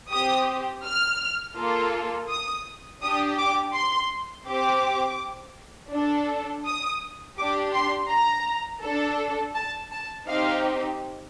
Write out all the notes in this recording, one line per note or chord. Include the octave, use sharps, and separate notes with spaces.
C4 G4 D#6
F6
A#3 F4 A4
D#6
D4 G4 D#6
D6
C6
C4 G4 D6
D4 A4
D#6
D4 G4 D6
C6
A#5
D4 A4
A5
A5
C4 D#4 G4 F5